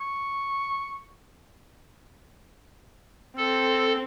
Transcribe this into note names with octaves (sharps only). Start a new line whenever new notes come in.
C#6
C4 A4